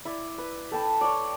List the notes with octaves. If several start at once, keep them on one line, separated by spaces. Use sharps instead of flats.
E4 D5
B4
A4 G5 A5 B5
C#5 D5